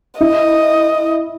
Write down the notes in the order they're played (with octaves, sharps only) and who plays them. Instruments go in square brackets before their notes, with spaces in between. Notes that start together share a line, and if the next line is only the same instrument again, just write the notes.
[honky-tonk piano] E4 [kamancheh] D#5